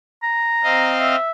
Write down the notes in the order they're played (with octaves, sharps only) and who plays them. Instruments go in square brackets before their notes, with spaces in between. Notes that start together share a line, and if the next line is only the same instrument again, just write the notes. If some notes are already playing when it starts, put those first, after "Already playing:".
[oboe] A#5
[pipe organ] C4 D#5 F5
[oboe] E5